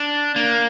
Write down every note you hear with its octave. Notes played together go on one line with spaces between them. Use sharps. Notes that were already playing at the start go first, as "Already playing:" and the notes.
Already playing: D4
A#3